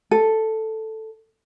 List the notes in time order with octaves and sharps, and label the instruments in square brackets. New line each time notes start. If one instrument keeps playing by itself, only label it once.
[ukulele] A4